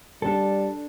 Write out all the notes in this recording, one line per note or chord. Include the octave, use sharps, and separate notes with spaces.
G3 D4 A4